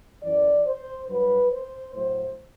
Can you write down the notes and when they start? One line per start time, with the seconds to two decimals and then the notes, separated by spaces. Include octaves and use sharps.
0.23 F#2 E3 D5
0.66 C5
1.09 G2 F#3 B4
1.51 C5
1.94 A2 F#3 C5